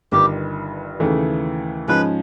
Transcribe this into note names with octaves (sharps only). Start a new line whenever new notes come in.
G1 G2 D#3 G4
D#2 C#3 E3 A3
G#2 F3 G#3 C#4 B4